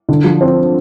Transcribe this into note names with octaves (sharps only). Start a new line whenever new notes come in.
D3
F3
C4